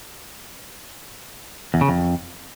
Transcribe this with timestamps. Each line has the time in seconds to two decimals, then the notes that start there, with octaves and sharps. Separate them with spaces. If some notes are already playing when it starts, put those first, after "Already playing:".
1.74 E2
1.81 C#3
1.89 F2